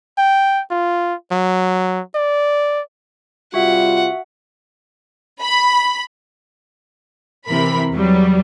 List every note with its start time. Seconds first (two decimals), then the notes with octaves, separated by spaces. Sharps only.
0.18 G5
0.71 F4
1.32 F#3
2.15 D5
3.54 C3 G3 F4 F#4 E5 F#5
5.42 B5
7.46 C3 E3 A#4 B5
7.92 E2 F#3 G3